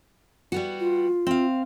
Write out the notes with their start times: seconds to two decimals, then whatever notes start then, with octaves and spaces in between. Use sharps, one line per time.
0.52 G3 B3 F#4
0.80 F4
1.27 C4 F5